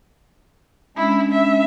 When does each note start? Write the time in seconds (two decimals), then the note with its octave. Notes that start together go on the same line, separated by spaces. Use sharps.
0.97 G#3 C#4 D4 E4
1.31 E5